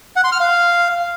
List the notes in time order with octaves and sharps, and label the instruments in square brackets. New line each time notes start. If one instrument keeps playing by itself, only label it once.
[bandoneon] F#5
C6
F6
F5